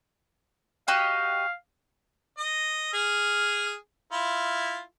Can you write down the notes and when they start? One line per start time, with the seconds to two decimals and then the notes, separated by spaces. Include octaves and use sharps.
0.88 F#4 G4 D#5 F5
2.38 D#5
2.93 G#4 F6
4.12 E4 F4